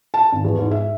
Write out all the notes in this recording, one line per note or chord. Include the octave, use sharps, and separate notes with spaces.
A5
G#1
E2
G#2
E5